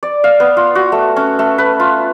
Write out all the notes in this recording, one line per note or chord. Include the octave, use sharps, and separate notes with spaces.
D5
F5
B3
F4
F#4
A3
C#4
A3
B4
F4